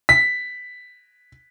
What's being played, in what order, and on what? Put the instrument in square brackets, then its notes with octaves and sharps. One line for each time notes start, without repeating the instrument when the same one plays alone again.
[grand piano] B6